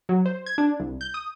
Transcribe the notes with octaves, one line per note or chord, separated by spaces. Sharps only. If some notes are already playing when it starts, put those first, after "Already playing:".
F#3
C5
G#6
D4
C2
G6
D#6